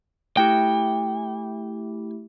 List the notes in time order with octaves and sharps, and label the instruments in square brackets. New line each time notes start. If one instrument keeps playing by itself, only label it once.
[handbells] A3 E4 G4 [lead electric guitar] G5